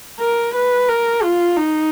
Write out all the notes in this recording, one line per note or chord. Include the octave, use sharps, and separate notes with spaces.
A#4
B4
A#4
F4
D#4